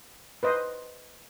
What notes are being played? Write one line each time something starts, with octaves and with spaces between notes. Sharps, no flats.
B4 C5 D#5